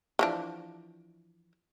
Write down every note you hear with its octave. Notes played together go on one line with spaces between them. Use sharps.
E3 F3 D4